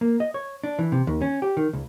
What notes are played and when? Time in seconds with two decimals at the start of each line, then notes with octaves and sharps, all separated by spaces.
0.01 A#3
0.20 D#5
0.34 C#5
0.64 D4
0.79 E3
0.92 C3
1.07 D#2
1.22 C#4
1.42 G4
1.57 D#3
1.73 C#2